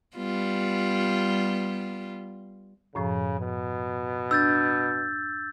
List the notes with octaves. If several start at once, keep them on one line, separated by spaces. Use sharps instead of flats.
G3 B3 F4
F#2 A2 C#3 F3
B2
D4 E6 G6 A6